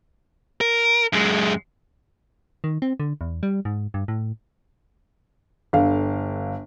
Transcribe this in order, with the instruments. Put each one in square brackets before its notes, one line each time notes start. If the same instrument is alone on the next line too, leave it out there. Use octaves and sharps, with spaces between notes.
[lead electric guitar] A#4
F#2 G#3
[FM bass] D#3
C4
D3
E2
G3
G#2
G2
A2
[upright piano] G1 D3 F5